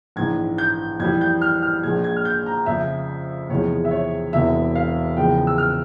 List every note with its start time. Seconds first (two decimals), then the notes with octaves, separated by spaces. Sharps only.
0.16 A#1 G#2 E3 G#6
0.58 G6
1.00 F2 E3 G3 G#6
1.21 G6
1.41 F6
1.63 F6
1.83 A#1 A#2 F3 G#3 G#6
2.04 G#6
2.16 F6
2.25 G6
2.46 A#5
2.66 F2 C#3 F3 E5
3.50 E2 C3 F3 G#3 C#5
3.85 E5
3.91 C#5
4.33 E1 E2 C3 E5
4.75 F5
5.17 E2 C#3 F3 G#3 G5
5.47 E6
5.58 F6